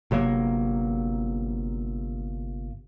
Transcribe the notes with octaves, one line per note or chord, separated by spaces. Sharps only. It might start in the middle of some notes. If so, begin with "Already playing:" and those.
G1 C3 F#3 A#3